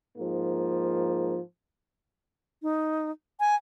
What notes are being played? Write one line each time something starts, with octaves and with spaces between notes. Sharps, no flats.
G#2 F3 A#3
D#4
G#5